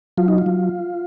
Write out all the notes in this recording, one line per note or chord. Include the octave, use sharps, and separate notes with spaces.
F#3 F4
D#4
F4
F#3